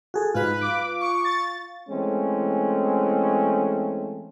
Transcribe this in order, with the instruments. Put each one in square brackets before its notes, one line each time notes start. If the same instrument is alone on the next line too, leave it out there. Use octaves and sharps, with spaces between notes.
[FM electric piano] F#4 G#4 A4
[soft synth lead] G#2 [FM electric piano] F4 F5 [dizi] B4
[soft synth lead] D6
[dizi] C#6
[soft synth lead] A6
[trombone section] E3 G#3 A3 C4 C#4